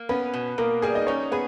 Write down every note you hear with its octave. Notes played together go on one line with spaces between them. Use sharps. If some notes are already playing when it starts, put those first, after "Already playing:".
Already playing: A#3
B3 C#4 B4
B2
B2 A#3 A#4
G3 G#4
D#4 D#5
C#4 D#4 C#5
B3 G#4 B4